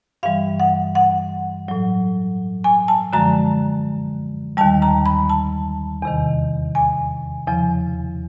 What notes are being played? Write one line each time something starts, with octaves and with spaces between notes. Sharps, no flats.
G2 E3 G3 F5
F#5
F#5
A2 F#3
G#5
A5
F#2 D3 F3 G#3 A#5
D#2 D#3 G3 A5
A#5
B5
A5
E2 C3 D#3
G#5
E2 C#3 F3